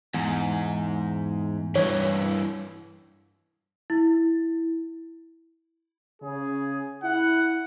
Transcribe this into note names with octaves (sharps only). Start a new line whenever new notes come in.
E2 G#2
G2 E3 C#5
E4
C#3 G#4
E4 F#5